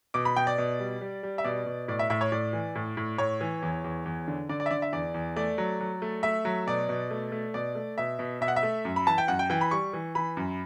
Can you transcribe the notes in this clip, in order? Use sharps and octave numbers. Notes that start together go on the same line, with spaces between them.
B2 D6
B5
B2 G5
D5
B2
G3
G3
G3
E5
B2 D5
B2
A2 D5
E5
A2 E5
C#5
A2 D5
E3
A2
A2
A2 C#5
E3
E2
E2
E2
D3
D3 D5
D5
E5
D3 D5
E5
E2 D5
E2
A3 D5
F#3
F#3
A3
A3 E5
F#3
B2 D5
B2
A3
A3
B2 D5
A3
B2 E5
B2
B2 E5
F#5
E5
A3
F#2
B5
E3 A5
G5
F#2 F#5
G5
E3 G5
B5
G3 C#6
E3
E3 B5
F#2